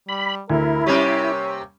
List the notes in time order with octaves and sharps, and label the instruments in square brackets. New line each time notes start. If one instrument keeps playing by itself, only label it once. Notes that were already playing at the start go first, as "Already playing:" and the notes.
[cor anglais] G3 [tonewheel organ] B5
[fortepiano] D2 [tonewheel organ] E4 [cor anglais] A#4
[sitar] C3 A#3 G4 [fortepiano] G3 C#4 [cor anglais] C#5